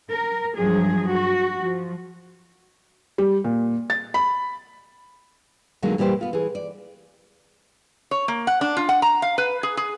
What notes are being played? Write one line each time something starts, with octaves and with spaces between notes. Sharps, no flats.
A#4
G2 F3 F#3 G#4
F#4
F3
G3
A#2
A6
B5
B2 D3 D#3 F#3 G#3 A#3
A#2 E3 G3 E4 G4 C5
B3 F4
E3 G#4
D5
C#5
A#3
F#5
D4
F4
F#5
A#5
F5
B4
G#4
G#4